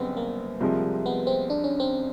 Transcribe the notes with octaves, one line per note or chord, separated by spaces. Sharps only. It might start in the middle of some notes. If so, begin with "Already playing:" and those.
Already playing: G1 F#2 C#3 B3 C4
A#3
C2 C3 F3 G#3
B3
C4
D4
C#4
C4